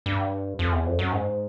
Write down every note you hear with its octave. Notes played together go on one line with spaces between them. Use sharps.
G2
F2
E2
F2
F#2
G#2